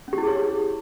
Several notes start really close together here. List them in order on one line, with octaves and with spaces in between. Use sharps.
C#4 G4 E4 G#4 C#5